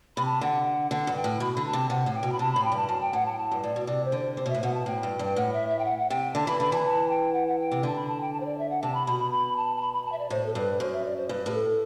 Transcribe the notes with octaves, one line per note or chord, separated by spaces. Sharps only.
C3 B5
A5
D3 F#5
D3 F#5
G2
G5
A2
B2 B5
D3 B5
A5
C3
C3 F#5
A2
G5
B2
B5
C3 A5
A2 B5
G5
G2 A5
F#2 A5
G5
A2 F#5
A5
G5
A5
G2
A2 D5
B2
C3 D5
C5
D3
C5
C3 C5
B2 E5
A2
B2 F#5
A5
A2 G5
G2
G2 G5
A2 F#5
E5
E5
G5
F#5
F#5
C3 G5
D3 A5
E3 B5
D3 B5
E3 A5
B5
A5
G5
F#5
F#5
G5
C3
D3 A5
B5
A5
G5
A5
C5
D5
E5
F#5
C3 A5
B5
B2 B5
B5
B5
A5
A5
B5
B5
A5
E5
D5
A2 C5
A4
G2 B4
F#2 C5
E5
D5
C5
G2 B4
A2 G4
A4